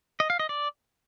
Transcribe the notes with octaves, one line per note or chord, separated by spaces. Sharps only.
D#5
F5
D#5
D5